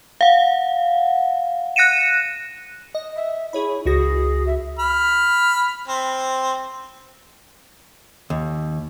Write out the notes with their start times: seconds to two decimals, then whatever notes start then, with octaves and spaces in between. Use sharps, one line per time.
0.21 F5 F#5
1.76 F#6 A#6 C#7 D#7 E7
2.95 D#5
3.16 E5
3.53 E4 G#4 C#5 B5
3.86 C#2 F#4 G#4 A#6
4.47 E5
4.79 B5 F6
5.88 C4
8.30 D#2